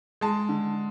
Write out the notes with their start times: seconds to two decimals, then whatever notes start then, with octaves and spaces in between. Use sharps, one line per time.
0.21 G#3 A5
0.49 D3